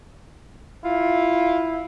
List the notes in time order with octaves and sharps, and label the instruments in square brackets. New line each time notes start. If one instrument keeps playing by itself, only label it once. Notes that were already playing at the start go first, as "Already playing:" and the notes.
[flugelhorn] E4 [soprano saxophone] F4